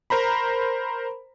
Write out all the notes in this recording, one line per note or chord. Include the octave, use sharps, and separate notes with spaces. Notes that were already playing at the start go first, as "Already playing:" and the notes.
A#4 C5 A#5 B5